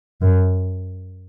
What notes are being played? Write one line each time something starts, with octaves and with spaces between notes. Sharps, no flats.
F#2